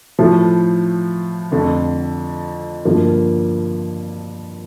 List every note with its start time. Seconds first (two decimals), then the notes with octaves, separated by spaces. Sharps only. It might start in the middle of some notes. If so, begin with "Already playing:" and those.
0.19 A2 F3 A3
1.51 F2 D3 A3
2.85 G2 D3 F3 A#3